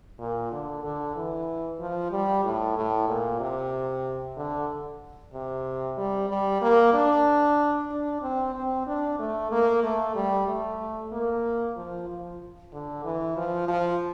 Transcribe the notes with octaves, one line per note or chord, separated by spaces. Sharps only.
A#2
D3
D3
E3
F3
G3
A2
A2
A#2
C3
D3
C3
G3
G3
A#3
D4
D4
C4
C4
D4
A3
A#3
A3
G3
A3
A#3
F3
F3
D3
E3
F3
F3